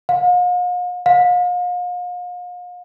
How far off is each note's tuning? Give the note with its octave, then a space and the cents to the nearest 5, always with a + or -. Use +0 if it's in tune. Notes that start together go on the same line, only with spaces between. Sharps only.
F5 +45
F5 +40